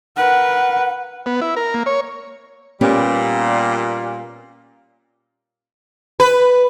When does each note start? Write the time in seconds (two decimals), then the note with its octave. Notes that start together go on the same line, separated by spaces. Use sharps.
0.17 A#4 B4 F#5
1.26 B3
1.42 E4
1.57 A#4
1.74 A#3
1.86 C#5
2.81 A#2 G3 B3 C#4 G4
6.20 B4